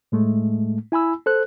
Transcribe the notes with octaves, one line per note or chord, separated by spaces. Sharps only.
A2 G#3 A3
E4 G#5 B5 E6
A4 C5 F#6